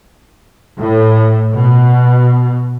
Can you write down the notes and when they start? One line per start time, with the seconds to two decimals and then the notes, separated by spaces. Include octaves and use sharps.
0.79 A2
1.54 B2